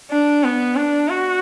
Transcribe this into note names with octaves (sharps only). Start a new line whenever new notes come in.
D4
B3
D4
F#4